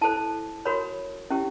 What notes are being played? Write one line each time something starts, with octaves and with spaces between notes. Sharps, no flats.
E4 A4 C5 A5
F#4 A#4 C#5 B5
C#4 E4 G4